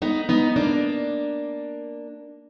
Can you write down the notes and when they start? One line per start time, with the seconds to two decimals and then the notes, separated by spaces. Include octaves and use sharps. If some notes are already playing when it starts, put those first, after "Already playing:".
0.02 B3 D#4
0.29 B3 D#4
0.56 A#3 D4